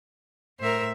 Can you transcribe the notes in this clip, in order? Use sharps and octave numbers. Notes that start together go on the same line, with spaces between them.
A2 A#4 C5 E5